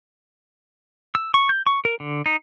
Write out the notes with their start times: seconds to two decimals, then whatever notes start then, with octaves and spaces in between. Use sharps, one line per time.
1.15 E6
1.34 C#6
1.49 G6
1.67 C#6
1.85 A#4
2.00 D3
2.26 D#4